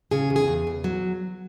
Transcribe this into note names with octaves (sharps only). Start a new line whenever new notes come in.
C#3 G#4
E2
G#4
E2
E2
F#3